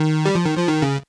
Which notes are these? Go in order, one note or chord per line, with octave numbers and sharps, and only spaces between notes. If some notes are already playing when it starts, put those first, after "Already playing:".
Already playing: D#3
G3
F3
D#3
F3
D#3
C#3